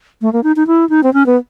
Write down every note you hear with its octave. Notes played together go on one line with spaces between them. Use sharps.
A3
A#3
D#4
D#4
E4
D#4
C4
C#4
B3